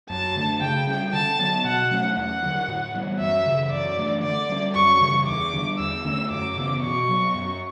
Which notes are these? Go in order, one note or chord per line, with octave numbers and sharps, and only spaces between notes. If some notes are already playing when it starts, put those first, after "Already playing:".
F#2 A5
D3 A3 D4
C#3 G5
G3 C#4
D3 A5
F#3 B3
B2 F#5
F#3 A3 C#4
E2 F#5
D3 F#3
A2
E3 G3 B3
F#2 E5
C#3 E3
F#2 D5
E3 A3 D4
D3 D5
G3 C#4
F#2 C#6
C#3 E3 G3
E2 D6
D3 G3
E2 E6
D3 A3 C#4
F#2 D6
C#3 E3 B3
B2 C#6
F#3 B3
F#2